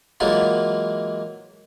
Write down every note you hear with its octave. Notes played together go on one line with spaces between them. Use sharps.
E3 F#3 G#3 A#3 F4